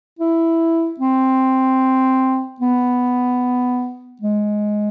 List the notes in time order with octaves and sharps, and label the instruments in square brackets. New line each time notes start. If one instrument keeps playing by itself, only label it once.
[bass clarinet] E4
C4
B3
G#3